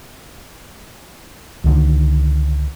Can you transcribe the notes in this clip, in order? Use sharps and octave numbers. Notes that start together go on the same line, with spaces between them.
C#2 D3 D#3